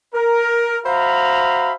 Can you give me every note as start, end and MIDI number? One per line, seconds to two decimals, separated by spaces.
0.15 0.79 70
0.86 1.73 66
0.86 1.73 72
0.86 1.73 76
0.86 1.73 77
0.86 1.73 82
0.86 1.73 83